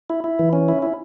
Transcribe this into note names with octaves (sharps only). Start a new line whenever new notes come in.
E4
E4
E3
C#4
E4
E4